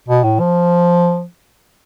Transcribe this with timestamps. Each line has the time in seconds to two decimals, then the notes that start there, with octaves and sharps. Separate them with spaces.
0.08 B2
0.24 A2
0.40 F3